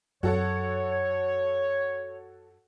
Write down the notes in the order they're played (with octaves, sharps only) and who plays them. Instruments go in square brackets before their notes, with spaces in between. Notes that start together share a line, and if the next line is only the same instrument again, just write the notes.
[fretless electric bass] F#2 [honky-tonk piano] F#4 A4 F#5 [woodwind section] C#5